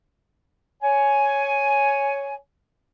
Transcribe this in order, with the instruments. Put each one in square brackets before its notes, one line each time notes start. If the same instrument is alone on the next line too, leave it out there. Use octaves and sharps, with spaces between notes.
[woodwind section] C#5 G#5